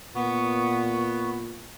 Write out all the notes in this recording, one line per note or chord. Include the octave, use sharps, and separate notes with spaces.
A#2 B3 C#6